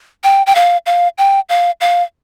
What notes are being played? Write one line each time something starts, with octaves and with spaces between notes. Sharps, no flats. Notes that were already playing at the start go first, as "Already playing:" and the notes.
G5
G5
F5
F5
G5
F5
F5